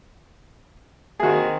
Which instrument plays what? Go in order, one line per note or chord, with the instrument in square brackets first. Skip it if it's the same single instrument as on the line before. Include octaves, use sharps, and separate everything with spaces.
[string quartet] D#3 C4 [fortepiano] F#4 G#4